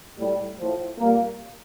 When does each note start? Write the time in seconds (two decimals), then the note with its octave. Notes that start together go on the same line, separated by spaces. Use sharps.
0.18 A2 G3
0.59 A2 F3
0.99 A#2 G3 A#3